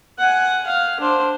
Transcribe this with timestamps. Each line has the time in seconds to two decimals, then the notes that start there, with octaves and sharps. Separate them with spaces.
0.18 F#5 G#5
0.66 F5
1.00 D4 C5